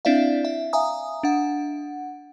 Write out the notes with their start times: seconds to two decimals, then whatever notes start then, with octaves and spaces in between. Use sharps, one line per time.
0.05 C4 D4 E4 D5 E5 F5
0.45 E5
0.73 E5 F5 G#5 A#5 D#6
1.23 D4 F#5